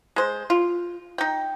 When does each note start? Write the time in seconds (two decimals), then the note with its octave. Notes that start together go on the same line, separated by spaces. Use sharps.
0.16 G#3 C5
0.50 F4
1.18 D#4 G5